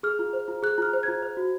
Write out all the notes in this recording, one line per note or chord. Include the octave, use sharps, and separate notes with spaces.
G#4 F6
F4
C5
F4
G#4 F#6
F4 F6
C5
F4 G#6
C5
F#4